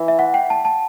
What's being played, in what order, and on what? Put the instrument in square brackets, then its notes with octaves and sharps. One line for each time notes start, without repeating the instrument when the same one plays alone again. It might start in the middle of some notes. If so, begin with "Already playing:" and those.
Already playing: [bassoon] E3
[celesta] E5
F#5
G5
A5
A5